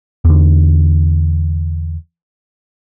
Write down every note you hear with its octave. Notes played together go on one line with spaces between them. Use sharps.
E2 D3